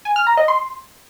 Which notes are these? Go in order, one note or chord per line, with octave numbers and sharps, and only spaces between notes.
G#5
F6
A#5
D#5
C6